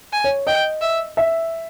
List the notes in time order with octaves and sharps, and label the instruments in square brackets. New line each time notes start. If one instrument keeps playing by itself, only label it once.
[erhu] G#5
[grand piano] C#5
[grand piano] D#5 [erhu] G5
[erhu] E5
[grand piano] E5